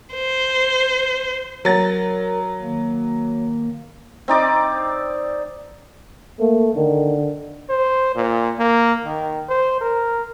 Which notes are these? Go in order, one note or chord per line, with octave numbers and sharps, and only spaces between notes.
C5
F#3 A#4 A6
D#3 A#3
C4 D#4 D5 D6
A3 A#3
D3 D#3
C5
A#2
A#3
D#3
C5
A#4